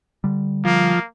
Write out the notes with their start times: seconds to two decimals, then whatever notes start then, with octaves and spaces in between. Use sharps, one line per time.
0.24 D3 G3
0.65 F3 A#3